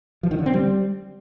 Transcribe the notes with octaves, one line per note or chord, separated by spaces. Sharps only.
F3
D#3
D3
C4
G3